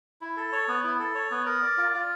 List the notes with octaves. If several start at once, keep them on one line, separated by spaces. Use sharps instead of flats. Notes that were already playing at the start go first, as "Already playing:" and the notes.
E4
A4
C#5
B3
E4
A4
C#5
B3
A#4
D5
F4
F4